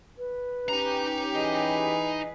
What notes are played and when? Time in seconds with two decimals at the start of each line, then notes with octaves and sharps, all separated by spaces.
0.17 B4
0.69 C#4 D#4 G4 A#5
1.34 E3 G#4 B4 D#5